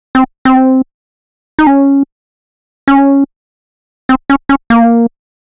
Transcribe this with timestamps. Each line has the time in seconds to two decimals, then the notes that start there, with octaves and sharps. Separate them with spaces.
0.15 C4
0.45 C4
1.59 D#4
1.67 C#4
2.88 C#4
4.09 C4
4.30 C#4
4.49 C#4
4.70 A#3